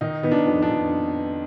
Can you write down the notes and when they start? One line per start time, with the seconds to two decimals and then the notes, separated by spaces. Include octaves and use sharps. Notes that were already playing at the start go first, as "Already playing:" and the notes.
0.01 D#3 D#4
0.23 D#3 B3
0.32 D4
0.47 F2
0.62 D4
0.70 F2